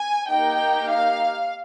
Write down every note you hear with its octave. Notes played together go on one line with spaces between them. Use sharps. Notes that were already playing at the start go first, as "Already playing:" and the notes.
Already playing: G#5
A#3 D#4 G4 G5
F5